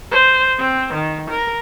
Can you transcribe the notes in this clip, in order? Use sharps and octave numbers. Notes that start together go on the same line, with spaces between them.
C5
C4
D#3
A#4